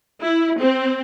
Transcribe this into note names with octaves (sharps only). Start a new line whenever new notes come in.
E4
C4